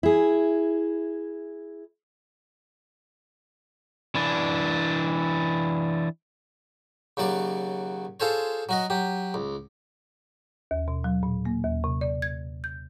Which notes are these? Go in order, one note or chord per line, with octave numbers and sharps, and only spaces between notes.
E4 G#4
E3 D4
D#2 C#3 F#3 D5 D6
F4 G#4 A4 C5 C#5
F#3 F#4 D#5
F#3 G4
C#2
D#2
B2
F#3
A#2
A#3
D#2
C3
D5
G#6
G6